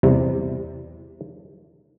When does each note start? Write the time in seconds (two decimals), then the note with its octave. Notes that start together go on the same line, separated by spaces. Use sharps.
0.03 E2 C3 G3